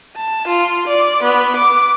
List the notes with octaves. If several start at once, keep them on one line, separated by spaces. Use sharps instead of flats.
A5
F4
D5
B3
D6